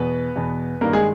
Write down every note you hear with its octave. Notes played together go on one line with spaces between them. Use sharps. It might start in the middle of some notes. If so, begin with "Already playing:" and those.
Already playing: E2 B2 B3 B4
E2 B2
G2 D#3 A#3 A#4
G#3 G#4